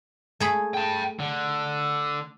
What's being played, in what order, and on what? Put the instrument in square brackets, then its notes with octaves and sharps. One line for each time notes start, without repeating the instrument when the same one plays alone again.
[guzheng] A3 G#4 B5
[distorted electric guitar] G5 A5
D3